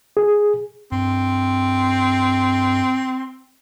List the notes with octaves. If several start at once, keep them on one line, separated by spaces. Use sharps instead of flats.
G#4
G2 C4